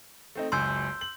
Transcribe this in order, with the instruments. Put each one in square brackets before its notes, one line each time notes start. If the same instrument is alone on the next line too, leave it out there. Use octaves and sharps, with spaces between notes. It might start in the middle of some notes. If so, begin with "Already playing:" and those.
[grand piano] A3 C4 D#4
[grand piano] F#1 C#2 G#5 [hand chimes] C6 E6 G6
[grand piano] F#7